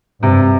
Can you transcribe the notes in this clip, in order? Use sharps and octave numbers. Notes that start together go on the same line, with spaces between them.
G2 C3